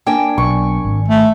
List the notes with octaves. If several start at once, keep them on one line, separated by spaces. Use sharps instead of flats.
A#3 D4 G5 G#5
B1 C#6
G#1
A3